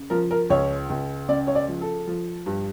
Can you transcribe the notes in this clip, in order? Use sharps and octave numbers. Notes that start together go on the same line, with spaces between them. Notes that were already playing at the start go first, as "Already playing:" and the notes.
Already playing: C#3
F3 A#4
A#4
C#2 C#5
C#2
C#3 D5
C#5
D5
F3
A4
F3
G2